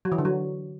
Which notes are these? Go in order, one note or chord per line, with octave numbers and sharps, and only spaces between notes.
F#3
E3
D3
F#3